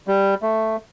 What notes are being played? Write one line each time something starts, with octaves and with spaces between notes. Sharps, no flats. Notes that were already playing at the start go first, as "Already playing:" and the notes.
G3
A3